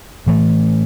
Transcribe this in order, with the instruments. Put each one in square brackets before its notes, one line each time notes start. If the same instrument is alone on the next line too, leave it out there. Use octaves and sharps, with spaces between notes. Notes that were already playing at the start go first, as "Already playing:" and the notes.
[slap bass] A2 E3 A3